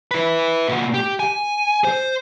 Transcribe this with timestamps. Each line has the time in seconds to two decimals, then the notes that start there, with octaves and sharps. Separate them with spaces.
0.11 E4 B4
0.68 A#2 F#4
0.94 G4
1.19 G#5
1.84 C5